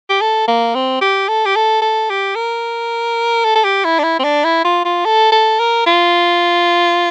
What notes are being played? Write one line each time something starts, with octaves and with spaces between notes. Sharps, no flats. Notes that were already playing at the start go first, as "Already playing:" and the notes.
G4
A4
A#3
C4
G4
A4
G4
A4
A4
G4
A#4
A4
A4
G4
E4
D4
E4
C4
D4
E4
F4
F4
A4
A4
A#4
F4